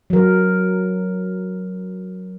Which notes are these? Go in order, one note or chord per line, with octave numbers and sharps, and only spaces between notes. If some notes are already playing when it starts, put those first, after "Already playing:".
F#3 A#4